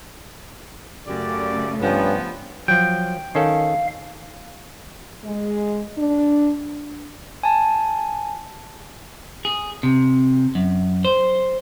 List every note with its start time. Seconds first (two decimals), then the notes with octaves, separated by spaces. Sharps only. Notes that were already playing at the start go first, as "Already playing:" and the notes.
1.06 F#2 C#3 A3 G4 D5
1.80 G2 F3 B3 C#4
2.68 F3 F#3 G5
3.35 D#3 C#4 A4 F5
5.24 G#3
5.97 D4
7.43 G#5 A5
9.45 G#4
9.83 C3
10.55 F#2
11.05 C5